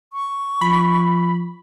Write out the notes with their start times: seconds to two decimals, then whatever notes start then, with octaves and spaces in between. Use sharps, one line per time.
0.13 C#6
0.61 F3 B5